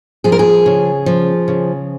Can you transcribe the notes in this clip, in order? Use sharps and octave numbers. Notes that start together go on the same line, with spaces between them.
F3 G#4
A#4
G#4
C#3
F3
C#3